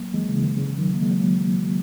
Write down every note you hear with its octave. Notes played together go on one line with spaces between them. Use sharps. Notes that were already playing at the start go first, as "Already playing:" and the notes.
Already playing: F#3 A#3
E3 G#3
C#3 E3
D#3
C#3 E3
D#3 F#3
A#3
E3 G#3
F#3 A#3